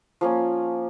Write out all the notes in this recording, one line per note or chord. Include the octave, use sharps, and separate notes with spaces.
F3 A#3 C#4